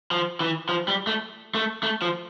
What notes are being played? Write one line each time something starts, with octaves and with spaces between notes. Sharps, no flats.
F3
E3
F3
G3
A3
A3
A3
F3